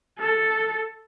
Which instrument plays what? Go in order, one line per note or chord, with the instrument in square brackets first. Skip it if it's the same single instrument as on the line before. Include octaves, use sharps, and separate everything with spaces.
[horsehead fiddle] A4